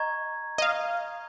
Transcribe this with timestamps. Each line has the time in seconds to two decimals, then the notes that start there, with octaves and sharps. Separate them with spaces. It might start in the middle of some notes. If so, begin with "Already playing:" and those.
Already playing: D#5 A#5 C#6 G#6
0.58 D#5
0.62 F5